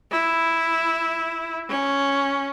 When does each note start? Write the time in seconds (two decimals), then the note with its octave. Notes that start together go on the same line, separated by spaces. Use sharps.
0.11 E4
1.69 C#4